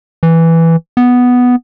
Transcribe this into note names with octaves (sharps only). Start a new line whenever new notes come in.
E3
B3